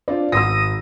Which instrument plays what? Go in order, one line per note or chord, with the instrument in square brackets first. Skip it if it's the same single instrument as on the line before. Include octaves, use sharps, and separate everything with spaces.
[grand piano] C4 F4 [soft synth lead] D4 [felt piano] D5
[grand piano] G#1 C6 [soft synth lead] D#6 [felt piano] E6 A#6